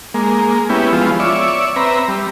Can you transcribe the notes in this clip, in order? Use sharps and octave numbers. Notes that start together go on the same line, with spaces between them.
G#3 A#3
B3 C#4 E4 G4
F3 G#3 B3 F4
C#5 D5 E5
C4 B4 E5 A#5
G3